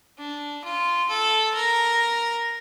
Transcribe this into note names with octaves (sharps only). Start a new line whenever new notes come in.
D4
F4
A4
A#4